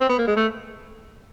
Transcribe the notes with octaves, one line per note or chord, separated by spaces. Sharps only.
C4
B3
A#3
G#3
A3